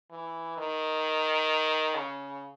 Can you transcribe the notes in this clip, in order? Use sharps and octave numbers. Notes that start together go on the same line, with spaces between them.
E3
D#3
C#3